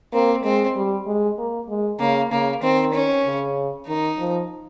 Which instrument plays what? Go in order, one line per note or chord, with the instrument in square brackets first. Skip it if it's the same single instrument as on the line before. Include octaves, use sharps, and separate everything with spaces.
[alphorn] A#3 [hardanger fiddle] C4
[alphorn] G#3 [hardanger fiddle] C4
[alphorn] G3
G#3
A#3
G#3
[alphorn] C#3 [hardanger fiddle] A#3
[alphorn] C#3 [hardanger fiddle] A#3
[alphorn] D#3 [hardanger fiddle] C4
[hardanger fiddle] C#4
[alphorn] C#3
[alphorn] D#3 [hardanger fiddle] D#4
[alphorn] F3